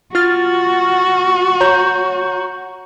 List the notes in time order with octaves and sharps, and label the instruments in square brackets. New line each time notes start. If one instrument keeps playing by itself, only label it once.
[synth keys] F4 F6 A6 [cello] F#4
[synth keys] C#5 A#5 G6